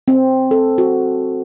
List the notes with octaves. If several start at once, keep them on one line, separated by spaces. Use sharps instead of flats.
C4
A4
F#4